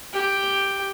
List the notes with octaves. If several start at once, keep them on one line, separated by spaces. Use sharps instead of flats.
G4 G5